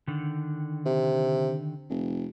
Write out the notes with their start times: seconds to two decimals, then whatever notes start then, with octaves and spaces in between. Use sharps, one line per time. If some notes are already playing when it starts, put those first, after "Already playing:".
0.08 D3 D#3
0.85 C3
1.90 F1